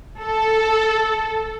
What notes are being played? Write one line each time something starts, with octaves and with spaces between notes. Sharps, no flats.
A4